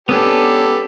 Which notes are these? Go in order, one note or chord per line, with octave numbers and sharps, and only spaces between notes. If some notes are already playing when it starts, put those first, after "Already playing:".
B3 C#4 D4 G4 A4 B4